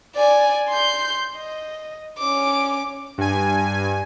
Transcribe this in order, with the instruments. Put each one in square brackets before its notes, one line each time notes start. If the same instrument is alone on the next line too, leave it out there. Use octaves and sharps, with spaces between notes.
[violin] D5 G#5
C6 G6
D#5
C#4 D6
[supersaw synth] G2 G#5